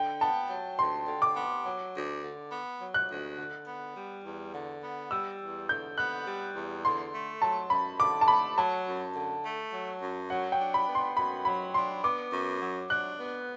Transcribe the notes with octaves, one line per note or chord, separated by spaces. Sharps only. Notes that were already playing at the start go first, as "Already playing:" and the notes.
Already playing: D3 G5
B3 A5
F#3
D2 C6
D3
D6
B3
F#3
D2
D3
B3
F#3
F#6
D2
D3
B3
G3
E2
D3
B3
G3 E6
E2
D3 G6
B3 F#6
G3
E2
D3 C6
A3
F#3 A5
F#2 B5
D3 D6
A5
A3 B5
F#3 A5
F#2
D3
A3
F#3
F#2
F#3 F#5
G5
D4
B5
B3
C6
F#2 B5
F#3 B5
D4 C6
B3 D6
F#2
F#3
D4 F#6
B3